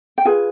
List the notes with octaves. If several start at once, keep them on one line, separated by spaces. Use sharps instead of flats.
G5
F4 G#4 B4 G#5